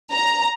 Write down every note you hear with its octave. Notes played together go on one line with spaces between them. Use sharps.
A#5